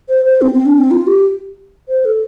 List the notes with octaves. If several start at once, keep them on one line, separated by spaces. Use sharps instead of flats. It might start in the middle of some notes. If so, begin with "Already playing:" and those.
C5
C5
C4
C4
D4
C4
F4
G4
C5
A4